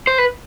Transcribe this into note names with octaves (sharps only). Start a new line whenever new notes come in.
C5
B4